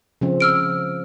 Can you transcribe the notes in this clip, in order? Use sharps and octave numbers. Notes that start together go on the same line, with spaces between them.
C#3 F3 C4
E6 F6 D7